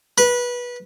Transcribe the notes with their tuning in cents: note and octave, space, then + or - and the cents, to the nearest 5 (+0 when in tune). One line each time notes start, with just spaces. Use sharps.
B4 -20